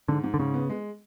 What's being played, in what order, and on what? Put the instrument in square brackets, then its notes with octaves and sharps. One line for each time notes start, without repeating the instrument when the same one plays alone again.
[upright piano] G#2 [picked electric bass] D3
[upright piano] G#2
[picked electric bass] D3
[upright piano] G#2 [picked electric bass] C#3
[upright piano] B3
G#3